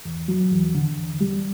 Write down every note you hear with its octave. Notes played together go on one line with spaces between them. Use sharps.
E2
F#3
E2
D3
E2
G3